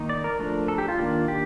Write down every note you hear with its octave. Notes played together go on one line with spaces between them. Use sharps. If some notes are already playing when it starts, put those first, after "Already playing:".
Already playing: D#3 A#3 D#4
D5
A#4
F3 A3 D4
A4
G4
F4
D#3 A#3 D4
G4